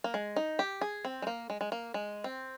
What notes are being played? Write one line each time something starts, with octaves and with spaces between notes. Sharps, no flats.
A#3
G#3
D#4
G4
G#4
C4
G#3
A#3
G#3
G#3
A#3
G#3
C4